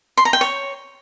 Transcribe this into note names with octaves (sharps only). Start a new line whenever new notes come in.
C6
A#5
G5
C#5